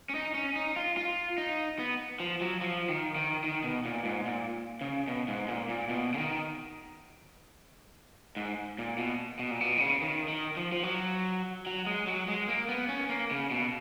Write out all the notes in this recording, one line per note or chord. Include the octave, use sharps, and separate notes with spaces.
C#4
D#4
C#4
D#4
F4
F4
D#4
B3
F3
F#3
F3
D#3
D#3
D#3
B2
A#2
G#2
A#2
C#3
B2
G#2
A#2
A#2
B2
C#3
D#3
G#2
A#2
B2
B2
A#2
B2
D#3
C#3
D#3
D#3
F3
F3
F#3
F#3
G#3
F#3
G#3
A#3
B3
C#4
A#3
C#3
B2